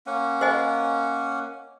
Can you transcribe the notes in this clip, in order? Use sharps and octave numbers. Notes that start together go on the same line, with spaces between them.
A#3 C#4 F#5
C5 D#5 G#5